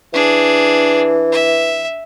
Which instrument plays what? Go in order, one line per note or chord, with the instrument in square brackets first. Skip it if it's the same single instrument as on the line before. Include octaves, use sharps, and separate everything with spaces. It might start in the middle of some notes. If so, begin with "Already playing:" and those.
[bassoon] E3 [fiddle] D4 G#4
[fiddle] E5